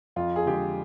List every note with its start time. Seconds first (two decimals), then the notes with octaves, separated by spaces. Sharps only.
0.16 F2 F4
0.36 G#4
0.46 D3 G#3 G4